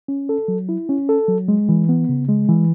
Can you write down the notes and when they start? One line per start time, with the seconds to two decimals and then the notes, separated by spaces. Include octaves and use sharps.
0.08 C#4
0.29 A4
0.48 F#3
0.69 E4
0.89 C#4
1.09 A4
1.28 F#3
1.48 G#3
1.69 E3
1.89 B3
2.09 C#3
2.29 G#3
2.49 E3